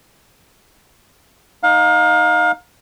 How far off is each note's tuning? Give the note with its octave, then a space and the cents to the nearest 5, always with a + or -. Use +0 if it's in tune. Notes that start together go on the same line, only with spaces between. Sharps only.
D#4 +0 F5 +30